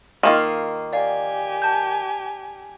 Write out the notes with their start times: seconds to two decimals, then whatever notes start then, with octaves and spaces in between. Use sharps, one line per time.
0.23 D#3 A#3 F4
0.93 G4 D5 F5 G#5
1.62 A5 G6